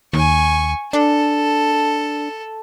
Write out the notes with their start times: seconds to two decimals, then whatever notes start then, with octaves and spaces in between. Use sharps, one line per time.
0.13 D#2 G#5 C#6
0.93 D4 A4